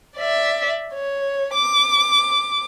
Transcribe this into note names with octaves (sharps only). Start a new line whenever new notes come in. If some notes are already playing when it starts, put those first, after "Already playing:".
D5 E5
C#5
D6